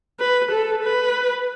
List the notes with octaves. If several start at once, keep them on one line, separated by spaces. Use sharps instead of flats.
B4
A4
B4